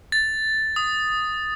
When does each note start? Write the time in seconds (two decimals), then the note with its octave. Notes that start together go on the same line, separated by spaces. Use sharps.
0.12 A6
0.76 D#6